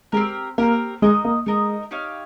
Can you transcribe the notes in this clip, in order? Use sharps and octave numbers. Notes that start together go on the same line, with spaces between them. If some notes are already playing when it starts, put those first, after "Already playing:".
G#3 C4 G4 A#4
A#3 C4 G4 A#4
G#3 D#4 A#4 D#5
A#3
G#3 D#4 A#4 D#5
D#4 G4 C#5 F5